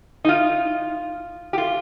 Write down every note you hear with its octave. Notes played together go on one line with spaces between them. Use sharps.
D#4
F4
G4
F4